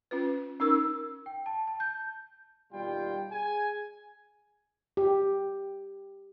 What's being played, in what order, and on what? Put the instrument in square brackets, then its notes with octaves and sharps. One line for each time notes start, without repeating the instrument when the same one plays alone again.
[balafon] C#4 F4 B4
[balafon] C#4 D#4 A#4 [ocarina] E6
[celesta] G5
A5
A5
G6
[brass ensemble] D#2 B2 G3 F4 G5
G#4 G#5
[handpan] G4